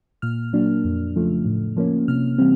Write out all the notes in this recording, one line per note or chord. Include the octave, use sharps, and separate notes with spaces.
A#2 F6
F#3 A#3 D4
F2
C#3 F3 A3
A2
F3 A#3 C#4
C3 F6
E3 G3 C4